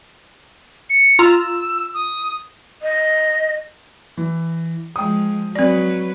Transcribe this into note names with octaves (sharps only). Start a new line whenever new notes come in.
C#7
F4 A#5 E6
D#6
D#5
E3
F3 G#3 G5 D#6
F#3 C4 B4 D5